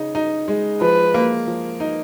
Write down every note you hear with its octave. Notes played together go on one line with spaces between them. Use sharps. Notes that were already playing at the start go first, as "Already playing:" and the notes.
Already playing: C#3 D#4
D#4
G#3
F3 B4
A#3
F3
D#4